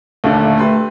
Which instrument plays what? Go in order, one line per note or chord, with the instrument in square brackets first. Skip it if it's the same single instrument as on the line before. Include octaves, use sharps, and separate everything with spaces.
[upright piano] D#2 A#2 D3 [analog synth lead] A3
[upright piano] G4 B4 C6